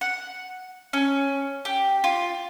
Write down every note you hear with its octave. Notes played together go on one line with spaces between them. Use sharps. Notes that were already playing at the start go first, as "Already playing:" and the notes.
F#5
C#4
G4
F4